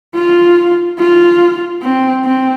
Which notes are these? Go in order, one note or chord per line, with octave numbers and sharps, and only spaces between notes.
F4
F4
C4
C4